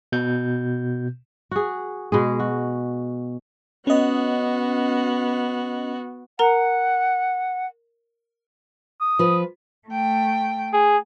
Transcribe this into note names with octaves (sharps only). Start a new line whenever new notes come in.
B2 G6
F#4 G#4
B2 G#3 G#4
F#4
B3 C#4 F#4 D#5
A#4 F#5 A#5
D#6
F3 B4
A3 G5
G#4